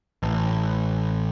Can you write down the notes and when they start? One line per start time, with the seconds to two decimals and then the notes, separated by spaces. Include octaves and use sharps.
0.23 A1